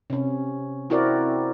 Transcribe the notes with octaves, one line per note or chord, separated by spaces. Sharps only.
C3 C#4
C4 E4 F#4 A#4 D5